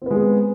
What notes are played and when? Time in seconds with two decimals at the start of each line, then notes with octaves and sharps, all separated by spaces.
0.02 C4
0.06 B3
0.11 G#3
0.15 G#4